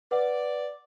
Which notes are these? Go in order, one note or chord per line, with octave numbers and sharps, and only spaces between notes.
B4 D5 F#5